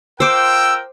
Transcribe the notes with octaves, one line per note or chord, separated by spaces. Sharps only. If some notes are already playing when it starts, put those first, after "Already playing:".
F4 A#4 C5 G5 D6 E6